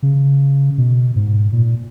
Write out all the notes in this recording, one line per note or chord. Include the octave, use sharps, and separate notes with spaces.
C#3
B2
G#2
A#2